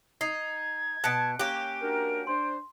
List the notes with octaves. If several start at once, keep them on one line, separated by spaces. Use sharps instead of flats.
D#4 G#6 C7
B2 A5 F#6 C#7 D7
A#3 C#4 G4 F#6 D7
D4 F#4 A#4
D4 C5 C6